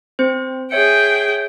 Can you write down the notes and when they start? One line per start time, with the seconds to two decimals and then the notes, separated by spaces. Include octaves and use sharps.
0.19 C4 C5
0.71 G#4 C#5 E5 G5 C#7